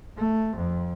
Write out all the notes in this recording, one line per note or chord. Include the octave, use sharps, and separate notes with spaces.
A3
F2